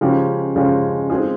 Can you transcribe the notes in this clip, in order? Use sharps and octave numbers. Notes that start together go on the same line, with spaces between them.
C#3 F3 G#3 C#4 G4
C#3 F3 G#3 C#4 G4
G#3 C4 F4 G#4